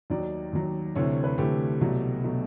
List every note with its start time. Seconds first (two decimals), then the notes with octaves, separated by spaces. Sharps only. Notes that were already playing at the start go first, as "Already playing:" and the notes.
0.10 D#2 D#3 F#3 D5
0.53 D#2 D#3 F#3
0.95 D2 C3 E3 A3 C#5
1.24 B4
1.38 D2 C3 E3 A3 G4
1.81 C2 B2 F#3 A3
2.24 B2 F#3 A3